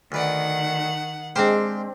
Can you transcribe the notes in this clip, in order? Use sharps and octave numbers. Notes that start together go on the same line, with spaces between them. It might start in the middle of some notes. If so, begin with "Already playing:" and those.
D2 D#3 B4 D5 F#5
G#3 C4 D4 G4 C5 F5 G5